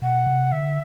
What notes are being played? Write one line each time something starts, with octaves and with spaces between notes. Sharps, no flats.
B2 F#5
C3
D3 E5